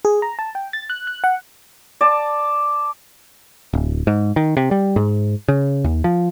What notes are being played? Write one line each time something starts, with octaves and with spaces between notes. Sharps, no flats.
G#4
A#5
A5
G5
A6
F#6
F#6
F#5
D5 A5
D1
G#2
D#3
C3
G3
G#2
C#3
D#2
F3